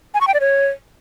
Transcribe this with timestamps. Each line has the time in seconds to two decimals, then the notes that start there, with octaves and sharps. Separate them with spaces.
0.14 G#5
0.21 C#6
0.27 G5
0.34 D5
0.41 C#5